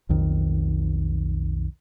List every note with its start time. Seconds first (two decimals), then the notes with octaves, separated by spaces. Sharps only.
0.09 B1 F2 D#3